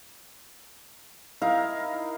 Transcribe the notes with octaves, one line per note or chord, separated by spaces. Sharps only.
D#4 E4 A#4 F5